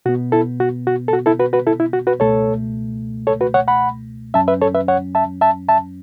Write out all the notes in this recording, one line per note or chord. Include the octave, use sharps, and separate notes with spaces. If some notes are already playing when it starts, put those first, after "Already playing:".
B2 B3 F#4
E4 A4
F#4
F#4
A4
F#4
E4 A4
F#4 B4
F#4 B4
E4 A4
E4
F#4
F#4 B4
C#2 B2 A3 A4 C#5
A4 C#5
F#4 B4
C#5 F#5
F#5 B5
F#2 F#3 C#4 E5 A5
B4 E5
A4 C#5
B4 E5
C#5 F#5
E5 A5
E5 A5
E5 A5